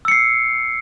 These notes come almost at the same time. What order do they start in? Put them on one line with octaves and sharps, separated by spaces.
E6 C#7 C7